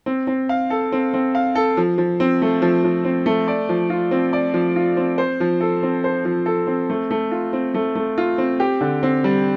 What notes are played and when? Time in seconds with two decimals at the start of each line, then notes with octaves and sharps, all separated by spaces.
0.06 C4
0.27 C4
0.49 F5
0.70 A4
0.92 C4
1.14 C4
1.35 F5
1.55 A4
1.77 F3
1.98 F3
2.20 C4
2.42 A3
2.62 F3
2.84 F3
3.05 C4
3.26 A3
3.48 D5
3.69 F3
3.90 F4
4.11 C4
4.33 D5
4.54 F3
4.76 F4
4.97 C4
5.18 C5
5.40 F3
5.60 A4
5.83 C4
6.04 C5
6.25 F3
6.46 A4
6.67 C4
6.90 A3
7.11 A3
7.31 F4
7.53 C4
7.74 A3
7.95 A3
8.18 F4
8.38 C4
8.60 G4
8.81 D3
9.03 C4
9.24 G3